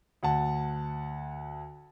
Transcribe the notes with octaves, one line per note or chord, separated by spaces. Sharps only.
D2 F#5 A5